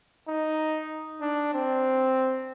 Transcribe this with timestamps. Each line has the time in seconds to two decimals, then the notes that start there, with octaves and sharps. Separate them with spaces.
0.28 D#4
1.21 D4
1.54 C4